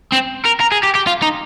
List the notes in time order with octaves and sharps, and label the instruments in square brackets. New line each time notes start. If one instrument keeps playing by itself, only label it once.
[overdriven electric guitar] C4
A#4
A#4
G#4
G4
G4
F4
D#4